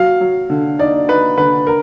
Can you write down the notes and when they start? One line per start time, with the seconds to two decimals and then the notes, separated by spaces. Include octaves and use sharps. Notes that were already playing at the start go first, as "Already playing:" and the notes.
Already playing: F#3 F5
0.21 F#3
0.50 D3
0.79 D#4 D5
1.08 D#4 B4
1.38 D3 B4
1.67 A#4